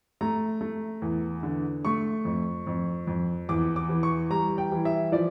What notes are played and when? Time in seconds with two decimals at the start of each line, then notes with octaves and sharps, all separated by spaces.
0.21 A3 A#5
0.61 A3
1.02 E2
1.43 D3
1.85 A3 C#6
2.25 F2
2.67 F2
3.07 F2
3.49 E2 D6
3.76 D6
3.89 E3
4.03 C#6
4.30 G3 A#5
4.58 G5
4.72 E3
4.85 E5
5.12 F3 D5